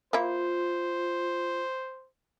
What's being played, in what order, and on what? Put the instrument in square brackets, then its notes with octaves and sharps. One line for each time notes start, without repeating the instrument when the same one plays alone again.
[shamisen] A#3 E4 [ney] F4 [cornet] C5